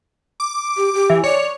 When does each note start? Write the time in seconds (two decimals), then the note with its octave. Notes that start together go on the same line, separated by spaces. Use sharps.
0.40 D6
0.77 G4
0.94 G4
1.10 E3
1.24 C#5 D5